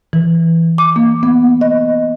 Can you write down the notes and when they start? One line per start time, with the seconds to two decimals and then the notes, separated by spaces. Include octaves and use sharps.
0.13 E3
0.78 D6
0.96 A#3
1.23 B3
1.61 D#5